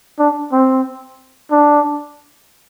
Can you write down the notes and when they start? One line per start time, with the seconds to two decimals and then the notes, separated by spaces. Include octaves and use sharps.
0.19 D4
0.52 C4
1.51 D4